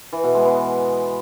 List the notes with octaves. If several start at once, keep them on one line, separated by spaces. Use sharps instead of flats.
E3
B2
G#3
B3